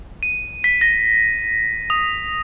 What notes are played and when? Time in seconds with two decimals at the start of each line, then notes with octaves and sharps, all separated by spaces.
0.23 D#7
0.64 B6
0.81 A#6
1.90 D#6